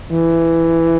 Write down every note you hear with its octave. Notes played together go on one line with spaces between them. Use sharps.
E3